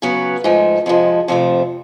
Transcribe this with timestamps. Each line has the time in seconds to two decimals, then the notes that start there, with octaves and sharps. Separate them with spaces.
0.02 C#3 F#3 B3
0.44 G#2 F3 A3
0.86 F2 C3 F3 G#3
1.28 F2 C3 F3 A3